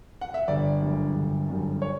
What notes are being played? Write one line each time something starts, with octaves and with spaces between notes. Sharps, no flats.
F#5
E5
G1 D5
F#2 D3 G3
G1
F#2 D3 G3
C#5